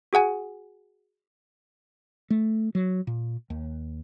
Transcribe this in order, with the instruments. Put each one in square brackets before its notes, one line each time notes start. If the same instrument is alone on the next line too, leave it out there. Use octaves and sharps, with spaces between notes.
[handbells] F#4 G#4 F#5 G#5
[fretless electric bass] A3
F#3
A#2
D#2